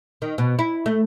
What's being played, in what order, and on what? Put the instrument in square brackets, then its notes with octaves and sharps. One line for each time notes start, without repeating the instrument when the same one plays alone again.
[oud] D#3
B2
E4
A3